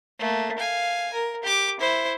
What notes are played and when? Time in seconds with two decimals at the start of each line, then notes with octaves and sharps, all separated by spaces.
0.19 A3 A#3
0.58 F5 G#5
1.13 A#4
1.43 G4 D6
1.80 E4 C5